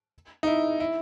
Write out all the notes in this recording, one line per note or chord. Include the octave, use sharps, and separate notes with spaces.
D#4
E4
E4